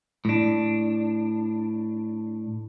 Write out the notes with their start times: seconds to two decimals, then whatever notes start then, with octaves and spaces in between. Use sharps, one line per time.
0.25 A2 D4